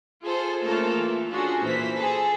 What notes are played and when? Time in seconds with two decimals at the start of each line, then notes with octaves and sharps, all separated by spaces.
0.23 F4 G#4 A4 C5
0.64 C#3 A3 A#3 F4 A4 A#4
0.95 E3
1.30 C#4 D4 F4 F#4 G#4 A4
1.62 A#2 E3 C5 B6
1.96 G#4 A4 C5